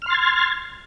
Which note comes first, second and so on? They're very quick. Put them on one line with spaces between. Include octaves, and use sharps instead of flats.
F6 C6 A6 G#6